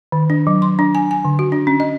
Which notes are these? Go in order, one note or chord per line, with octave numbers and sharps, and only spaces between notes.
D#3
D4
F#3
C6
D4
G#5
G#5
D3
F#4
D4
C#4
D#5